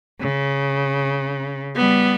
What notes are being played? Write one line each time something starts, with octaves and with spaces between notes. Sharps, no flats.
C#3
G3 B3